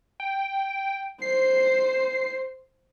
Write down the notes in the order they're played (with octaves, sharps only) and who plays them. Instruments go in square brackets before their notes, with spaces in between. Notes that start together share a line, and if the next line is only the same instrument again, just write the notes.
[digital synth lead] G5
[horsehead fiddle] C5 [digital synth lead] C7